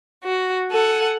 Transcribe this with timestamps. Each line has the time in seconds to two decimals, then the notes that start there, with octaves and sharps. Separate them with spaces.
0.24 F#4
0.70 A4 F#5 G#5